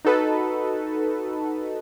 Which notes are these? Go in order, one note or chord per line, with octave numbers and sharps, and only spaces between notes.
D#4 F#4 A4 B4